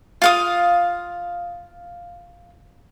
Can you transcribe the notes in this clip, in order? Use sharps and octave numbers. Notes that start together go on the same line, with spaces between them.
F4 F5 D#6